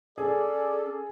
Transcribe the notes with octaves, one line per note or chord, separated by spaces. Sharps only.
C#4 G#4 A4 D5